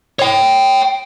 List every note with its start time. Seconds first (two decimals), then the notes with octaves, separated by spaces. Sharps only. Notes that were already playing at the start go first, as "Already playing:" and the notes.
0.19 C#5 G5